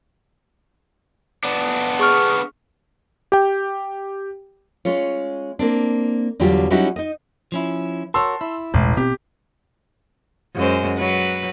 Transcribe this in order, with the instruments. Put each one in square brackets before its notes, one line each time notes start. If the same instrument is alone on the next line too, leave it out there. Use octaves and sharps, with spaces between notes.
[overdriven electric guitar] B3 D4
[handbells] G#4 C#6 F6
[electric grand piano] G4 G5
[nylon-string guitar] G#3 C#4 F4 C#5
A#3 C4 D4
E2 D3 F#3 G3 F4 G4
F#3 G3 C#4 D#4 E4 F#4
D#4 D#5
[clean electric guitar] F3 C#4 E4
[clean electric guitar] F#4 A#4 C#5 [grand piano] A5 C6 E6
[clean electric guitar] E4
[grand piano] A1 [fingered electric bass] E2 B2 G#3
[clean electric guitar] B2 [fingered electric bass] C4 [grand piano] G4
[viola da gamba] F#2 G#3 C5
F#3 B4